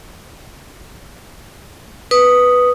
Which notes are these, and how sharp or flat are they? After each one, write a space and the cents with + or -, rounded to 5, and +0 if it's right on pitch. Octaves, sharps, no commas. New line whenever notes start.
B4 +0 D#6 +0